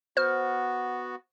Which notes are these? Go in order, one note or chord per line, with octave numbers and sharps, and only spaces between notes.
B3 F#4 C5 F6